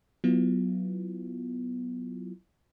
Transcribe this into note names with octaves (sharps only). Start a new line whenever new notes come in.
F#3 B3 E4 F4